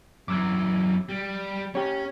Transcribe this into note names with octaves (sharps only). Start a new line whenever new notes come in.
F#2 E3 D6 E6 G#6
G3
C#4 G4 C#5